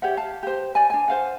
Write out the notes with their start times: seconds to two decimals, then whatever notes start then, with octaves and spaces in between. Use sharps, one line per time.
0.02 G4 C#5 E5 F#5
0.17 F5 A5
0.43 G4 C5
0.75 D5 G#5
0.90 D4 G#5
1.08 C5 F5 F#5